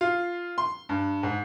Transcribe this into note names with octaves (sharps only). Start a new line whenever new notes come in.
F4
C6
G2
G#2